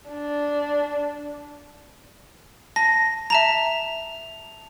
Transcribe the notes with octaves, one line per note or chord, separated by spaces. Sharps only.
D4
A5 A#6
E5 A5 A#5 F7